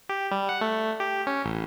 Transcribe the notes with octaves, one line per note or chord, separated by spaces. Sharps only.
G4
G3
F#5
A3
G4
C#4
A1